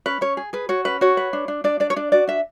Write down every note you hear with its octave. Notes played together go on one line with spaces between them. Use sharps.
C#4 B4
C#4 C#5
G#4
G#4 B4
F#4 C#5
C#4 B4
F#4 C#5
B4
D4
D4
D4 D5
D4 D5
C#5
D4 D5
F#4 D5
D4 E5